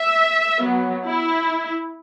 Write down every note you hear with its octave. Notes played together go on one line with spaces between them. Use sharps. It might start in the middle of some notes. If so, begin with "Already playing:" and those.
Already playing: E5
F#3 B3
E4